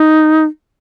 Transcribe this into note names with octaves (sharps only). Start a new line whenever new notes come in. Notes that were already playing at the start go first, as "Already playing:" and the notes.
Already playing: D#4